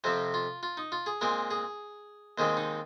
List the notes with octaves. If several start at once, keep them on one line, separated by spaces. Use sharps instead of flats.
F2 C3 F3 C4 C5
F4
F4
D#4
F4
G#4
A#2 G#3 C4 A#4
G#4
D#2 D#3 G#3 C4 C5
D#4